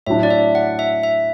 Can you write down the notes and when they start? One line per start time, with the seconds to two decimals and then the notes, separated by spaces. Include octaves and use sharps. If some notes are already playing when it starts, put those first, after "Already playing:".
0.06 A2 F#3 D4 E5
0.23 D5
0.30 E5
0.55 F#5
0.79 E5
1.03 E5